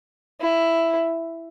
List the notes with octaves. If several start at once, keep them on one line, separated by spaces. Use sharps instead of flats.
E4